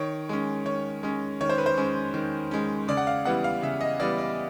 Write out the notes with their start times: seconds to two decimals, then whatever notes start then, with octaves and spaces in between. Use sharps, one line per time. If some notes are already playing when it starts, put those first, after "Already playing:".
Already playing: D#3 C#5
0.29 G#3 C#4
0.65 D#3 C#5
1.03 G#3 C#4
1.41 D#3 C#5
1.49 C5
1.58 B4
1.66 C5
1.77 G#3 C#4
2.14 D#3
2.51 G#3 C#4
2.88 C#3 D5
2.97 F#5
3.07 F5
3.25 E3 G3 B3 F#5
3.44 F5
3.62 C#3 E5
3.81 D#5
3.99 E3 G3 B3 D5
4.18 D5